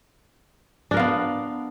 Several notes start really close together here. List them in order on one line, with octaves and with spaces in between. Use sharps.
D4 A#4 F5 B3